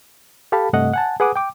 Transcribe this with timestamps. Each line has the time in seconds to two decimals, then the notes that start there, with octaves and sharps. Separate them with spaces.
0.52 G4 A4 F5 A5 B5
0.73 G2 C3 A3 D#5 F#5
0.94 F#5 G#5 A5
1.20 G#4 B4 F#5 G#5 D6 D#6
1.36 G5 D6